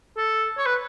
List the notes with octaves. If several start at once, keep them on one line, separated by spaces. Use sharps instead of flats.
A4
C#5
B4